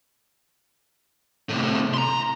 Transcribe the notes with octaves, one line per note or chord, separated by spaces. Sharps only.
A2 C3
A#5 C6